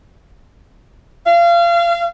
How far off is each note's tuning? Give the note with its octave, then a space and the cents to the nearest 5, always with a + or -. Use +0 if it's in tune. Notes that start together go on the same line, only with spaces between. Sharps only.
F5 -30